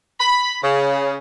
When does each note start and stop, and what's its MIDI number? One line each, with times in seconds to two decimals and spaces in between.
0.20 0.57 83
0.63 1.17 49